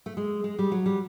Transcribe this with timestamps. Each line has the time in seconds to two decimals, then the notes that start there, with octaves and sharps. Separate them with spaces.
0.06 A3
0.17 G#3
0.44 G#3
0.59 G3
0.72 F#3
0.86 G3